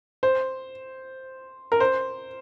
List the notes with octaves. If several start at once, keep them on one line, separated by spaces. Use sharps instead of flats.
C5
A#4
C5